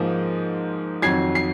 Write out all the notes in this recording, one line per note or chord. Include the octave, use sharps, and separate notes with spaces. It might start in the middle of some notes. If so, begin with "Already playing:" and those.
Already playing: G#2 F3 A#3 D#4
F2 D#3 F#3 G#6 C7
C7